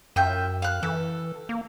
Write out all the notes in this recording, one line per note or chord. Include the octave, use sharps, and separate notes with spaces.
F#2 F4 E5 G5
F5 F#6
E3 A4
A#3